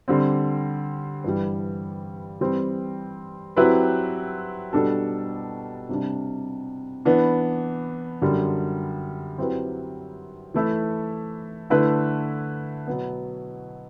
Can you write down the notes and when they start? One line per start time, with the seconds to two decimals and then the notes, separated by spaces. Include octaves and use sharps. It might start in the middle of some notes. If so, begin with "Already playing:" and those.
0.08 D3 G3 C4
1.24 G2 E3 G3
2.40 E3 G3 C4
3.56 F#3 C4 E4 G4 B4
4.73 B2 G3 D4 A4
5.89 C3 G3 D4
7.05 E3 B3 D4
8.22 F#2 D3 G3
9.38 F#3 C4 E4 G4 B4
10.54 E3 A3 E4 A4
11.70 D3 A3 E4 B4
12.87 B2 F#3 B3